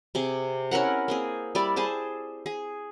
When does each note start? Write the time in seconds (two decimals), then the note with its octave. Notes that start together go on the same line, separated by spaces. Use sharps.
0.15 C3 G#4 D6
0.71 C#4 E4 A#4 F#5
1.08 A#3 C4 G#4
1.55 G3 E4 D5
1.76 G#4 C5 A5
2.46 G#4